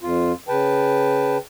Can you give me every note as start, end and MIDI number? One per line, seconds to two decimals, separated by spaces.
0.03 0.33 41
0.03 0.33 65
0.48 1.37 49
0.48 1.37 71
0.48 1.37 79
0.48 1.37 81